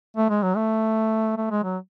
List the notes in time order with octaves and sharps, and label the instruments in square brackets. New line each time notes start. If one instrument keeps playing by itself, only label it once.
[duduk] A3
G#3
F#3
A3
A3
G#3
F#3